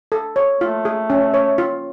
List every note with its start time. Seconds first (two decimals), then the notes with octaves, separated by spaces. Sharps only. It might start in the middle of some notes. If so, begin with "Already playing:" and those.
0.12 A4
0.36 C#5
0.61 A3 F4
0.85 G#4
1.10 C#4
1.34 C#5
1.58 F4